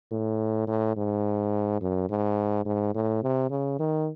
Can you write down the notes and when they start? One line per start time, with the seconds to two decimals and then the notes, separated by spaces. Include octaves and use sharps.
0.12 A2
0.67 A2
0.97 G#2
1.81 F#2
2.10 G#2
2.66 G#2
2.95 A2
3.23 C3
3.50 C#3
3.79 D#3